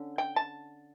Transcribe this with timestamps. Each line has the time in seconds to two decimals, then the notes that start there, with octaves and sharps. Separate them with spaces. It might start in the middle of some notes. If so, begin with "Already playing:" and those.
Already playing: D3 C#4
0.18 G5
0.36 A5